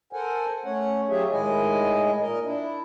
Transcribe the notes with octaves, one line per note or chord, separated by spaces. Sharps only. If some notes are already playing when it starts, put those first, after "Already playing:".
A4 A#4 C5 F#5 G#5
A3 C#4 C#5 F#5
F#3 F4 G4 G#4 C#5 E5
A2 D#3 G#3 E4 D#5 G#5
A#2 A#4 D#5
D4 E4